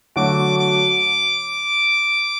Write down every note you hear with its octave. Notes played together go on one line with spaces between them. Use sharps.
D3 F#3 A3 F#4 D6
D6